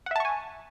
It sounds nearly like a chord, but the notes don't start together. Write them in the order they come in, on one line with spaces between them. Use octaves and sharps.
F#5 E5 A5 C#6 G#5